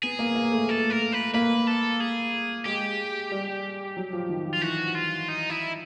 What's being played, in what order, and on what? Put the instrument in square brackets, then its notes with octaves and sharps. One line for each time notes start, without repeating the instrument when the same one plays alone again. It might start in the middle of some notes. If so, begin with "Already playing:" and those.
[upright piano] B3 [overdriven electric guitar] G#4
[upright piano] A#3
A#3
A3
[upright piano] A3 [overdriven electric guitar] A4
[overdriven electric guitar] A#4
B4
[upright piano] A#3 [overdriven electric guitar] B4
[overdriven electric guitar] A4
G#4
[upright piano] G#3 [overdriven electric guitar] G4
[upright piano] G3
F#3
F3
D#3
F3
[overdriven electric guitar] F4
[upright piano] E3 [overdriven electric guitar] F#4
[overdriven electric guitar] F4
D#4
E4